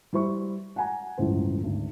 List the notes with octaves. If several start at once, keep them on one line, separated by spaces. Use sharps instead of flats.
G3 E4 C5 C#6
F#5 G#5 A#5
G1 C#2 A2 E3 C5
G#1 D2